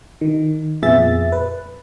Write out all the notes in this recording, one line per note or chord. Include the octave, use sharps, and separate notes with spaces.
D#3
F2 A#2 B3 G#4 E5 A6
B4